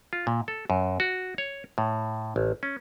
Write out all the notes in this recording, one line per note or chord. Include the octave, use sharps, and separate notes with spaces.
F4
A#2
A4
F#2
F#4
C#5
A2
A1
C#4